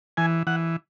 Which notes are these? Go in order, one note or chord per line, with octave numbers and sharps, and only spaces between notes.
E3 G#5
E3 F#5